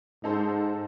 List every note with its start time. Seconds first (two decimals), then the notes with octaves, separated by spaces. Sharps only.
0.24 G#2 D#4 A4 C5